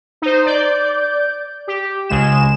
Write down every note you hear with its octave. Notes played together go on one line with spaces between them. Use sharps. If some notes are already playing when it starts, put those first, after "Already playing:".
D#4 C5
D5 G6
G4
C#2 C#3 G#3 E7